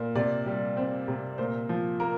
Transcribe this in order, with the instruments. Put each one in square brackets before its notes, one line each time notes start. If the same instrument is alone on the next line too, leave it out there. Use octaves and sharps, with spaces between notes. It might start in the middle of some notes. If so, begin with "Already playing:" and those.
Already playing: [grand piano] A#2
C3 D5
G3
C4
C3
A#2 C5
F3
A#3 A#4